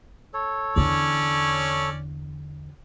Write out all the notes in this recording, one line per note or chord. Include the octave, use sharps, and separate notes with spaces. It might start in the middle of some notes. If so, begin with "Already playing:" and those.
A4 C#5
E2 D3 C#4 D5